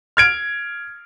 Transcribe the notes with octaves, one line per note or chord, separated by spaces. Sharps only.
F6 G#6 D7